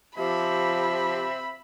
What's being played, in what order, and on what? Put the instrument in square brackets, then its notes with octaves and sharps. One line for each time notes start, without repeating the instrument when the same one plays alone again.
[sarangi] F3 [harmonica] C4 E5 [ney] G4 [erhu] B5